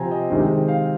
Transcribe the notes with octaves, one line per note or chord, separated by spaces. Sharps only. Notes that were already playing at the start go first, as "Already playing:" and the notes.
Already playing: C3 F3 C4 G5 G#5 A#5
D#5
C3 D#3 G#3 C4
F5